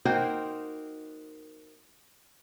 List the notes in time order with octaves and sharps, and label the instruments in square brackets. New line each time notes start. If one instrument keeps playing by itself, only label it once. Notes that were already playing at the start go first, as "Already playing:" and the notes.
[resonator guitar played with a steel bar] A#3 D#4 F#4 A#4 C5 G5